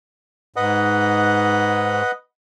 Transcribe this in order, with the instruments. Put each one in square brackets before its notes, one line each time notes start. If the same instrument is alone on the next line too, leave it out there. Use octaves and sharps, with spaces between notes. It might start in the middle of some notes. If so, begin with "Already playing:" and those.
[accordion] G#2 [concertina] B4 D#5 F#5